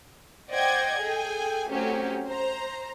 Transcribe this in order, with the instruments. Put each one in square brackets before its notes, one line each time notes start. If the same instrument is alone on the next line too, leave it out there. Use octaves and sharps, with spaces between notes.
[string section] C5 D5 D#5 F#5 G5 G#6
G#4 A4 G5 G#5
F#3 A3 C4 C#4 G4
C5 A#5